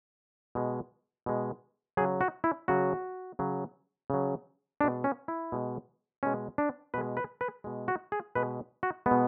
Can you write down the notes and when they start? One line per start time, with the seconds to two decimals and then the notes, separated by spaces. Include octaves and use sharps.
0.55 B2 G#3
1.26 B2 G#3
1.97 F#3 G#4
2.00 C#3
2.21 F#4
2.44 E4
2.68 C#3 F#3 F#4
3.39 C#3 F#3
4.10 C#3 F#3
4.81 B2 G#3 D4
5.04 C#4
5.28 E4
5.52 B2 G#3
6.23 B2 G#3 C#4
6.58 D4
6.94 B2 G#3 B4
7.17 B4
7.41 B4
7.64 B2 G#3
7.88 F#4
8.12 G#4
8.35 B2 G#3 B4
8.83 F#4
9.06 G#3 B3
9.11 B2